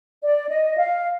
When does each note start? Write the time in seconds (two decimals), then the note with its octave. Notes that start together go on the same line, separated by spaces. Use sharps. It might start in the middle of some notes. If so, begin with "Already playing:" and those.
0.21 D5
0.49 D#5
0.76 F5